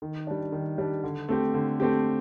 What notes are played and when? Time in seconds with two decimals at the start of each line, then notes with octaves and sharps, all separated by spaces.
0.02 D#3
0.27 G3 D4
0.52 D#3
0.78 G3 D4
1.04 D3
1.29 A3 C4 G4
1.54 D3
1.80 A3 C4 G4